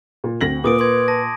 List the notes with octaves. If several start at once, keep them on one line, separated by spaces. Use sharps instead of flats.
A#2
D2 C4 A#6 F#7
A#2 A#3 B4 D6 D#6 D7
B4 C6 G#6
A5 A#6